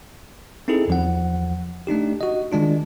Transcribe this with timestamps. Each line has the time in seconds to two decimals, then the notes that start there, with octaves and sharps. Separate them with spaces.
0.68 C4 D#4 E4 G#4 A4
0.88 E2 F3 F#5
1.87 A3 D4 D#4 G4
2.21 F#4 D#5
2.52 D#3 G#3 D4 F4